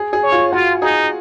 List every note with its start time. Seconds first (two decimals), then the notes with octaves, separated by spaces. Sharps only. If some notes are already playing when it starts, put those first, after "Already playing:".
Already playing: G#4
0.13 G#4
0.23 C#5
0.32 F4
0.53 F4 F#4
0.82 D#4 G#4